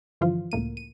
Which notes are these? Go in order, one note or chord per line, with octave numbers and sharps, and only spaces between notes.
G2 D3 E3 F3 F4
C#2 A2 A#3 D#7
D#7